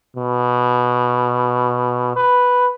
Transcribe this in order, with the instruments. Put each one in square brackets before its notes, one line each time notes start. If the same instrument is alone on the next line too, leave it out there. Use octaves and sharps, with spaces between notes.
[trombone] B2
B4